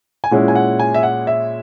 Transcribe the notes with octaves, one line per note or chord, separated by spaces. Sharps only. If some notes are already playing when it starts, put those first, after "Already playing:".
G#5
A#2 G#3 C#4 E4 F#5
G#5
F#5
G#5
E5
F#5
E5